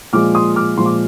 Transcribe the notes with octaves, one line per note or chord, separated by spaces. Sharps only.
A#2 F3 G#3 D6 F6
C6 D#6
D6 F6
A#2 F3 G#3 C6
D6